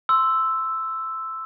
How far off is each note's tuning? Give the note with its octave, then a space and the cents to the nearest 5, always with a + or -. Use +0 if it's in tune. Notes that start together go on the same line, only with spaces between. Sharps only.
C6 +0 E6 +0